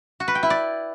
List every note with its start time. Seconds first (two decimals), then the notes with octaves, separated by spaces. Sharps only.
0.20 F#4
0.28 B4
0.35 G5
0.43 E4
0.50 D5